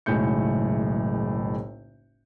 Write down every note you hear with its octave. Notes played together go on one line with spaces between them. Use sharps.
F#1 B1 A2 G#3 G6 C#7